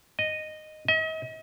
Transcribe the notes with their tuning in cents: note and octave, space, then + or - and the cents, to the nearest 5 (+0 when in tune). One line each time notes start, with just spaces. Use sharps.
D#5 -10
D#5 +40